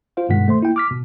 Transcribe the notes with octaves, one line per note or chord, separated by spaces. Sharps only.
F4 C5 F5
G2 B2 D#3 G#3 F#5 B6
A3 C5 C6
A#3 E4 G5
D6 F6 B6
B2